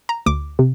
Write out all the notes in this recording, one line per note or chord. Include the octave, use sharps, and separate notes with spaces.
A#5
D2 D6
C3